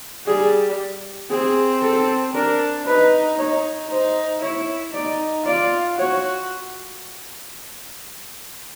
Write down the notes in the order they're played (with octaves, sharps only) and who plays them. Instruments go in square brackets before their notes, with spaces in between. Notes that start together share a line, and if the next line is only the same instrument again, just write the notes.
[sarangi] G3 [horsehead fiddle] G#4
[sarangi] C4 [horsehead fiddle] G#4
[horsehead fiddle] A4
[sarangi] D4 [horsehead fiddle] A#4
[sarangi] D#4 [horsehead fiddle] B4
[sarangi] D#4 [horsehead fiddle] C#5
[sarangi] D#4 [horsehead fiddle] C5
[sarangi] E4 [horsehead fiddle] C#5
[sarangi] D#4 [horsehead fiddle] D5
[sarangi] F4 [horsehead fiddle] D5
[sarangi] F#4 [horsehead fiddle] C#5